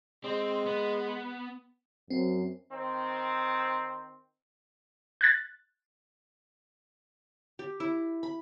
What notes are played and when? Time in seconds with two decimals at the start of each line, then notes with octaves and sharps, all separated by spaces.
0.24 G#3 C4
0.66 B3
2.10 F#2 C4
2.72 D#3 C4
5.21 F#6 G#6 A6
7.59 G4
7.80 E4
8.23 B5